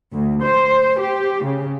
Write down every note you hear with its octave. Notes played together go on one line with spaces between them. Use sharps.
D2
C5
G4
C#3